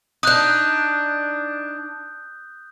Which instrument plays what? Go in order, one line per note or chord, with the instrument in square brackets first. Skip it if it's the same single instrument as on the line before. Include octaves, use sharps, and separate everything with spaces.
[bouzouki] D4 D#4 [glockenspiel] D#6 F#6 G6